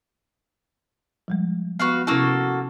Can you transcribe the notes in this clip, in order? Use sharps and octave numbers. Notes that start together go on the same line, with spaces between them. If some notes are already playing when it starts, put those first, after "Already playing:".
F3 G3 G#3
B3 F#4 B4 F5
C3 A#3 C#4 E4 F#4 A4